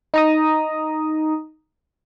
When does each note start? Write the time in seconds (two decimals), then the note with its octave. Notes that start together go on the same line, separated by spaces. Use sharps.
0.14 D#4 A#5 D#6